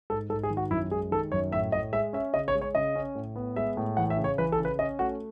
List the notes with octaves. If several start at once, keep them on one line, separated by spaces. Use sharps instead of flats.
G#2 A4
G#2 A4
G#4
D#3
F#4
F#2 E4
G#3 G#4
D#3 A4
F#2 C#5
A2 E5
A2 D#5
G#3 E5
C#4 E5
C#3 D#5
C#5
G#3
C#5
C#3 D#5
C#4
A2
B3
G#3 E5
A2
E3 F#5
E5
C#3
C#5
E3 B4
A4
C#3
B4
C#4 D#5
A3 F#4